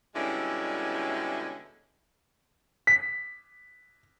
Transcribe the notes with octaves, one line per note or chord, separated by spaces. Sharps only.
B2 D3 G3 G#3 C#4 E4
B6